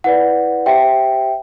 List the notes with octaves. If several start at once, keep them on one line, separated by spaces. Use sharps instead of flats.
E4 B4 D5 F#5
G4 C5 E5 G5